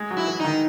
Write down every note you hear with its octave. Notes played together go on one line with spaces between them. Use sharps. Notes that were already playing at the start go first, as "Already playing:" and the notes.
Already playing: G#3
F#3
E4
E3
D#3 D#4